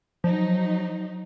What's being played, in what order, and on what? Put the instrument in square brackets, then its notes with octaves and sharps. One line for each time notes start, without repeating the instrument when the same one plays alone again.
[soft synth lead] F3 [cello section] F#3 D#4